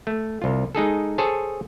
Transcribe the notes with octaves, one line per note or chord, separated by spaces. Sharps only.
A3
C2 F4
G#3 D#4 G#4 A4
G#4 A4 C5 C#5 A5